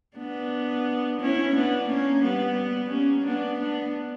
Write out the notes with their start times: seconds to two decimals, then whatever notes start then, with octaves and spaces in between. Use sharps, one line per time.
0.17 B3 D4
1.21 C#4 E4
1.55 B3 D4
1.88 A#3 C#4
2.23 G3 B3
2.91 A#3 C#4
3.25 B3 D4
3.60 B3 D4